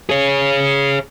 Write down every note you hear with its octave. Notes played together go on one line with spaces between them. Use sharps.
G#4 C#5